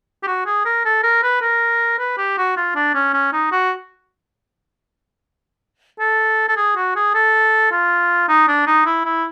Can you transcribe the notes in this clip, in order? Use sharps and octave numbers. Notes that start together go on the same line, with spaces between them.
G4
F#4
G#4
A#4
A4
A#4
B4
A#4
B4
G4
F#4
F4
D4
C#4
C#4
D#4
F#4
A4
A4
G#4
F#4
G#4
A4
F4
D#4
D4
D#4
E4
E4